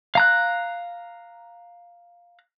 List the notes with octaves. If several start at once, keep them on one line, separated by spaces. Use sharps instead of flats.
F5 A#5 F#6